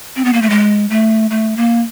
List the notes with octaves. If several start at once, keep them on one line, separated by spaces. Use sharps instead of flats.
C4
B3
A#3
A3
G#3
A3
A3
A#3